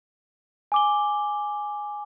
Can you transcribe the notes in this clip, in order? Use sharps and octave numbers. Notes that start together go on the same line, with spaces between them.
G#5 D6 G7